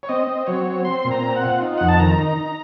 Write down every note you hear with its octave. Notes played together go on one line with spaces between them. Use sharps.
C#5
C4 D#5
C4
F#3 C#5
C4
C4 C6
A#2
A#5
C4
F#5
F4
D#4
F2 F#5
A5
D#3 A#5
D#4
D#4